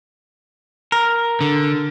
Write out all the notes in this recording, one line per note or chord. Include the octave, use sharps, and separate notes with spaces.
A#4
D3